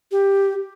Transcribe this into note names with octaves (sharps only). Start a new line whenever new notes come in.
G4